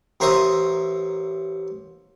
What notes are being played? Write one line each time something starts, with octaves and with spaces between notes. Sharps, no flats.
A1 A#4 C5 E5 C#6 D#6